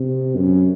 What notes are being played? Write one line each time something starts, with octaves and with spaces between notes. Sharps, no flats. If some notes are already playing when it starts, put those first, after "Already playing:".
Already playing: C3
F#2